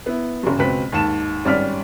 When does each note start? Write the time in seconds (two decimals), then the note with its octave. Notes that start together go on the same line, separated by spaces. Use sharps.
0.06 B3 E4
0.43 F#1 F#2
0.58 C#2 B2 C4 B4 B6
0.92 D#2 G#2 A5 E7
1.45 G#1 G3 C#4 D5 F6 B6